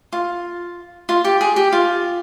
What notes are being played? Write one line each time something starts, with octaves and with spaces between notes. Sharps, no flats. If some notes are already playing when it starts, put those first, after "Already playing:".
F4
F4
G4
G#4
G4
F4